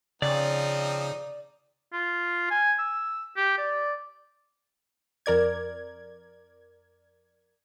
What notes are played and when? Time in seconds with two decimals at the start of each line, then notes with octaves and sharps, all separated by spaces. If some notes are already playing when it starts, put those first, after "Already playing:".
0.22 C#3 F3 C4 D#4 D5
1.93 F4
2.50 G#5
2.79 E6
3.37 G4
3.58 D5
5.26 F2 A#4 D5 G#6